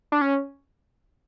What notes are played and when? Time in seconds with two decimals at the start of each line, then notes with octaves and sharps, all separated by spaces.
0.12 D4
0.21 C#4